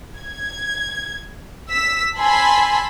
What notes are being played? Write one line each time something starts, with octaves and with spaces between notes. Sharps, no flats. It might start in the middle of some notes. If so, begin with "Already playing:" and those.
G#6
E6 B6
G#5 A5 B5 C6 E6